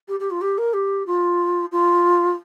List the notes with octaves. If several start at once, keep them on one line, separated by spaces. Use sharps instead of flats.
G4
G4
F4
G4
A#4
G4
F4
F4